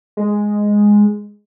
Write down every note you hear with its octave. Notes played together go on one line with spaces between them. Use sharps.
G#3